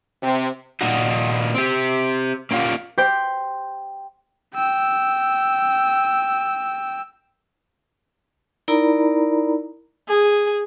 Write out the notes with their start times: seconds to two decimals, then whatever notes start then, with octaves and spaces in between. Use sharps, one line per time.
0.23 C3
0.81 A#2 D#3 D#4 F#4
1.54 C4 G4
2.51 A#3 C#4 F4 G4 A#4
2.98 G4 C5 G5
4.55 G5 E6
8.68 D#4 E4 A#4 D5 A#5 B5
10.09 G#4